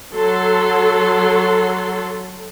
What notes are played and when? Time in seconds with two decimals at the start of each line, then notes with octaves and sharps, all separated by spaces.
0.16 F#3 A4 C6